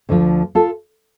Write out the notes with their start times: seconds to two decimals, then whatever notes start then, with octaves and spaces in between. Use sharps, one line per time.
0.09 D2 D3 F3
0.55 F4 A4